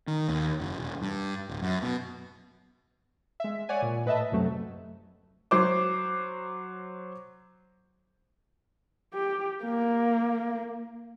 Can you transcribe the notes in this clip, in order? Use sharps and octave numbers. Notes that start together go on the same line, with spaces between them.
D#3
D#2
F#1
E1
G2
D1
F#2
B2
G#3 E5
C#5 D5 F#5 G#5
A#2
A2 B4 D#5 E5 A5
C2 F#2 C3 F#3 A3
F#3 C5 D6
G4
A#3